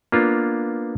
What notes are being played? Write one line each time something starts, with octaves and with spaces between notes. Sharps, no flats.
A#3 B3 D4 F4